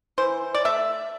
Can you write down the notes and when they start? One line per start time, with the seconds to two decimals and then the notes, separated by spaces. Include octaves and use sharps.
0.18 E3 C5
0.55 D5
0.65 A3 E5